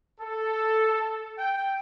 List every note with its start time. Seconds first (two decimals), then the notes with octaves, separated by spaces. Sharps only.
0.20 A4
1.38 G5